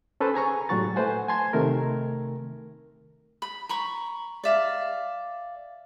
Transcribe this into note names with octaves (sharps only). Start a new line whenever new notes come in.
C#4 A4 B4 C5
G#4 G#5 A#5 C#6
A2 F#3 G3 F#4 C#6 A6
A3 B4 C5 F#5 G#5
G#5 A5 C6 G#6
C3 D#3 A3 A#4
B5
A#5 B5 C#6
D5 E5 F5